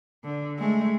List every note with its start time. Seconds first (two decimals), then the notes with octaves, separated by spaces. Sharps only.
0.24 D3
0.58 G#3 A3